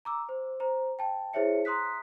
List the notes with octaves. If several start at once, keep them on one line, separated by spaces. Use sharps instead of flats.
A#5 D6 E6
C5
C5 A#5
G5 A5
E4 G#4 C5 C#5 E5 C#7
A#5 C6 D#6 F#6 B6